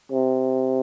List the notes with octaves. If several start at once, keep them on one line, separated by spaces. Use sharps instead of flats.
C3